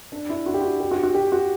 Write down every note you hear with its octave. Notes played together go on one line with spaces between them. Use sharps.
D4
E4
F#4
G4
F#4
G4
F#4
F#4
G4
F#4